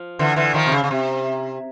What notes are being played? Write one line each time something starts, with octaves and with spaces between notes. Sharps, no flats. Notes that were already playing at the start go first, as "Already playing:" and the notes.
Already playing: F3
D3 E3
D3 E3
D#3 F3
C3
C#3
C#3
C3